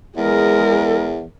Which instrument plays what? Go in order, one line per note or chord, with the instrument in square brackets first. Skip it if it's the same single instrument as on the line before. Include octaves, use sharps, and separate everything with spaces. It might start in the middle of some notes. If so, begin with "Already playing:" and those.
[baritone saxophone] E2 [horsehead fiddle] G#3 A#4